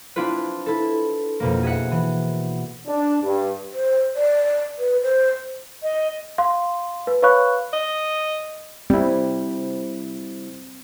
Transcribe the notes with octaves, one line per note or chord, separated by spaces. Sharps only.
C4 D4 E4 F4 B4
E4 A4
F2 B2 A#3
G#4 E5 F#5
E3
D4
G2
C5
D5
B4
C5
D#5
F5 C6
B4
B4 C#5 F5 B5 C#6 F#6
D#5
G3 C4 E4